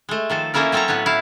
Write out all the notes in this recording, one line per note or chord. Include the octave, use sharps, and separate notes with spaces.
G#3 A3
D#3 F3 A4
F3 A3 A#3 C#4 E4 A#4
F#3 C4 C#4 A4 C#5 A#5
A2 B3 B4 C#5
E4 F5